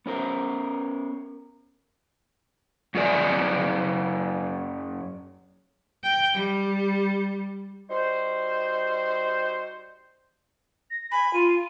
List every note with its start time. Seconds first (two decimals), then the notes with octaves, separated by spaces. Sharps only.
0.06 B3 C#4 A#4 C5
2.95 F#2 F#3 G#4 D5 G#5
6.04 G5
6.34 G3
7.90 G3 D#4 F#4 C5
10.90 A#6
11.11 G#5 B5
11.33 F4 D#7